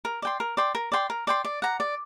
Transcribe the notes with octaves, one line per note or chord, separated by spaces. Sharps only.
A#4
D5 G5 C6
A#4
D5 G5 C6
A#4
D5 G5 C6
A#4
D5 G5 C6
D5
F#5 A#5
D5